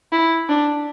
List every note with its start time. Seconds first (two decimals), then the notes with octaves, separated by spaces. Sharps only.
0.12 E4
0.49 D4